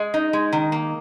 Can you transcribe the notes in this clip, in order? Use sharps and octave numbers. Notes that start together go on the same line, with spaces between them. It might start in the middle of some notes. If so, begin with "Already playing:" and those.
Already playing: G#3
D#4
G#3
D#3
A#3